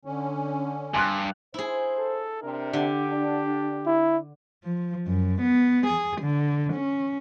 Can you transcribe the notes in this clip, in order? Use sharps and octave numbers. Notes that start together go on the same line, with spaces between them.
D3 C#4
G2 G#5 C6 F#6
E4 G#4 C5
A4
C3 D4 A#4
D3 G4
D4
E4
F3
F#2
B3
G#4
D3
C#4